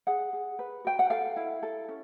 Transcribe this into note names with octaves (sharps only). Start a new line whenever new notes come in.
G#4 F#5
G#4
B4
F#4 G5
F#5
A4 F5
E4
A4
C#4